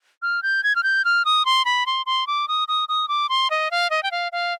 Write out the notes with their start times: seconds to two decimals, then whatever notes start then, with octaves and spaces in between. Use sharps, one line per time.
0.22 F6
0.43 G6
0.63 G#6
0.76 F6
0.83 G6
1.05 F6
1.25 D#6
1.45 C6
1.65 B5
1.86 C6
2.06 C6
2.27 D6
2.48 D#6
2.68 D#6
2.89 D#6
3.08 D6
3.29 C6
3.50 D#5
3.71 F5
3.90 D#5
4.03 G5
4.11 F5
4.32 F5